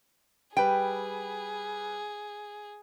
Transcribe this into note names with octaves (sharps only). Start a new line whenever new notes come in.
G3 G#4 B4 G5